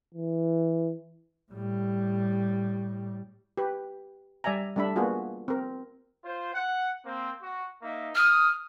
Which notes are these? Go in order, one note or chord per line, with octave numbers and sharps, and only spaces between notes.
E3
A2 G3
G4 B4
G3 D5 E5 G#5 A#5
G3 A3 D4 E5 B5
A#3 B3 F4 F#4 G#4
C4 A#4
F4 C5
F#5
A#3 C4
F#4
A#3 D#4 E5
D#6 F6